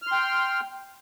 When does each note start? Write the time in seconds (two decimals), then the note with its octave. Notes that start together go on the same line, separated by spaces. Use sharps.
0.02 F6
0.07 C6
0.12 G5